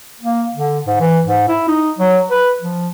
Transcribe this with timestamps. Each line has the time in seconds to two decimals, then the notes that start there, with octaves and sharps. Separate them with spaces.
0.21 A#3
0.55 D3
0.86 G#2
1.00 E3
1.24 G#2
1.48 E4
1.68 D#4
1.99 F#3
2.31 B4
2.61 F3